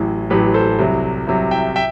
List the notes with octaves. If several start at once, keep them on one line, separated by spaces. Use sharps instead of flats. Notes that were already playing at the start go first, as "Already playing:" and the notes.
Already playing: A1 A2 F#3
A1 A2 F#3 G4 B4
A4 C5
C2 C3 F#3
C2 C3 F#3
E5 G5
E5 G5